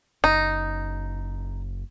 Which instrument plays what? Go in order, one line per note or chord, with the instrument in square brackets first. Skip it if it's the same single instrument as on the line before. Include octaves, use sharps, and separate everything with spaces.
[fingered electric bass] F#1 [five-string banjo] D#4